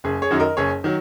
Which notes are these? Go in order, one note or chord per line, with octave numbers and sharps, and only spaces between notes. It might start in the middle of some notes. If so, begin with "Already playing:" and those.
F#1 G#4
G#4 C#5
F#2 D#3 F#3
A#4 D#5
F#1 G#4 C#5
D#3 F#3